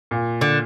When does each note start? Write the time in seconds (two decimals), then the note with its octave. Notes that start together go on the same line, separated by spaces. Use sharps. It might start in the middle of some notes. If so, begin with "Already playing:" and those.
0.11 A#2
0.41 D3